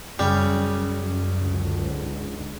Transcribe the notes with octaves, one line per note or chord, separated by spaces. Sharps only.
F#2 C#3 G3 C#4
C#2 G#2 D3